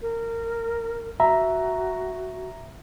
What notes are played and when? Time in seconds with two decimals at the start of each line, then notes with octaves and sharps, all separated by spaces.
0.02 A#4
1.20 F#4 E5 A#5